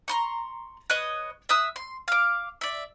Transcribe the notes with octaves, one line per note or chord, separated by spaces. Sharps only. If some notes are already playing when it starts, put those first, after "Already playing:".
A#5 C6 C#6
B4 C#5 D#5 F#6
E5 D#6 E6 F#6
C6
F5 D6
D5 E5